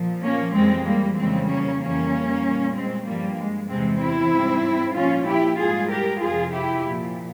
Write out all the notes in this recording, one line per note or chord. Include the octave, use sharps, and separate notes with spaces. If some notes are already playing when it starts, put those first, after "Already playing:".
Already playing: A#2 F3
A#3 C#4
F2 E3 G3 G#3 C4
G3 A#3
F2 C#3 E3 G3 G#3 C4
A#3 C#4
F2 E3 G3 A#3 C#4
A#2 G3
G#3 C4
G2 F3 G3 A#3
G#3
E2 C3 E3 G#3 C4
C4 E4
G#2 G3
A#2 F3 C#4 F4
E4 G4
G#2 G3 F4 G#4
G4 A#4
F2 C3 F3 F4 G#4
E4 G4
A#2 F3